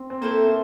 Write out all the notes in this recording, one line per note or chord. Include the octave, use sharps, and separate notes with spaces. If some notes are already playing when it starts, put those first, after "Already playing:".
Already playing: C4
C4
A3 A#3 E4 A4 C5
A#3